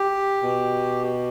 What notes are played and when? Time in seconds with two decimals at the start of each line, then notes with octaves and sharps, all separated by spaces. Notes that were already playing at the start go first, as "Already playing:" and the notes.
Already playing: G4
0.42 B2